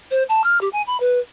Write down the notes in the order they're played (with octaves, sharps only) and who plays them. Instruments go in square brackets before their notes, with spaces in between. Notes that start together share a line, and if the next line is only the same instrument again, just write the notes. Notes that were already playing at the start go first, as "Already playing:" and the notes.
[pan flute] C5
A5
F6
G4
G#5
B5
B4